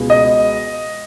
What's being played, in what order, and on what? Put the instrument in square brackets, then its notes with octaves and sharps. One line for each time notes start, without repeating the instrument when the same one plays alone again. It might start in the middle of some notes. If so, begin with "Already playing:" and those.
Already playing: [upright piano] C#2 B2 G#3 B3
[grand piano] D#5